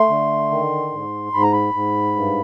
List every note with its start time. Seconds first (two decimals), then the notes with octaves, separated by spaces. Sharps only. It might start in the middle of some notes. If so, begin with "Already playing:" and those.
Already playing: A3 C6
0.09 D3
0.51 D#3
0.91 G#2
1.33 G#2 B5
1.43 A#5
1.53 B5
1.74 G#2
2.16 G2